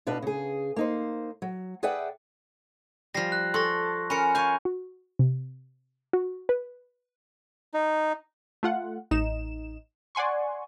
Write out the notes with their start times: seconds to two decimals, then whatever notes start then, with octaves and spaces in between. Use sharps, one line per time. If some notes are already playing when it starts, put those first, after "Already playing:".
0.07 B2 D4 B4 F5
0.22 C#3 G#4
0.76 A#3 D#4 C5
1.42 F#3
1.83 G#4 B4 D5 E5 F#5 G5
3.14 F3 G3 A#6 C7
3.32 F#6
3.54 A4 C6 C#6 A#6
4.10 C#4 A#4 B5 C#7
4.35 F5 G#5 C#6 G6
4.65 F#4
5.19 C3
6.13 F#4
6.49 B4
7.74 D#4
8.63 A3 F4 F#5
9.11 A1 D#4 E7
10.15 D5 F#5 G#5 C6 C#6